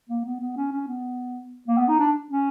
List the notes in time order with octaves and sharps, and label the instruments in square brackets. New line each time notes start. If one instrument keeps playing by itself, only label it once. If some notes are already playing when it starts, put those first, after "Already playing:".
[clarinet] A#3
B3
B3
C#4
C#4
B3
A#3
B3
D#4
D4
C#4